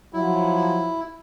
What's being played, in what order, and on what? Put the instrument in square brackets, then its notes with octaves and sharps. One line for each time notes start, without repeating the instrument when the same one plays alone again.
[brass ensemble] F3 F#3 [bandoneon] E4